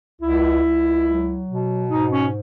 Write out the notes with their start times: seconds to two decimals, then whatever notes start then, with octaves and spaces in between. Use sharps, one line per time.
0.22 C#2 E4
0.64 C#2
1.06 F#3
1.49 B2
1.91 G#2 D#4
2.11 C#4